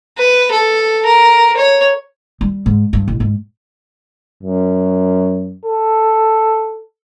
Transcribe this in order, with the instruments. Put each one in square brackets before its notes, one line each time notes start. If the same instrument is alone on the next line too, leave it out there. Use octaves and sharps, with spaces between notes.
[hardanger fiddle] B4
A4
A#4
C#5
[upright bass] G3
G#2
G2
A1
G#2
[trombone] F#2
A4